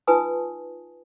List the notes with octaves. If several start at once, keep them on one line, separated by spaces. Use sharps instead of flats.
D#4 F4 B4 G#5 A5 D#6